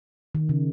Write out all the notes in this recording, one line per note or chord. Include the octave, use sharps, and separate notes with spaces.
D#3
C#3